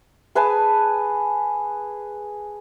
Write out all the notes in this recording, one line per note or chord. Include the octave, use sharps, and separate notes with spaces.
G#4 B4 G#5 A5